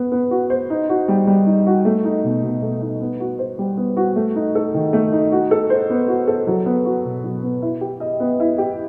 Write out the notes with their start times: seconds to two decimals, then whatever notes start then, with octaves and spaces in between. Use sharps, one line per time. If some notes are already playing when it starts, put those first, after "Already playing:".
Already playing: B3
0.12 B3
0.31 F#4
0.50 C5
0.70 D#4
0.89 F#4
1.08 G3
1.27 G3
1.47 D#4
1.67 F#4
1.85 A3
2.05 D#4
2.24 B2
2.43 B2
2.62 A3
2.82 D#4
3.01 B3
3.20 F#4
3.39 C5
3.58 G3
3.77 B3
3.97 F#4
4.16 A3
4.36 D#4
4.55 A4
4.74 D#3
4.93 A3
5.12 D#4
5.32 F#4
5.51 A4
5.70 C5
5.90 B3
6.08 F#4
6.28 A4
6.47 F#3
6.66 B3
6.85 F#4
7.04 B2
7.24 F#3
7.43 B3
7.62 E4
7.81 G4
8.00 D#5
8.20 B3
8.40 E4
8.58 G4